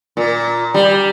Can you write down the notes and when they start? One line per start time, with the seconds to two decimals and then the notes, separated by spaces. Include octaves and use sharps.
0.17 A#2
0.74 G3